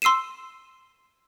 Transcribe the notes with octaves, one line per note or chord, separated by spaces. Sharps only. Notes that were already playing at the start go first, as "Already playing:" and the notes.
C6 E6 C7 D#7 E7